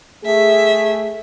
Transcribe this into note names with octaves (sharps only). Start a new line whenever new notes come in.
A3 G#4 E5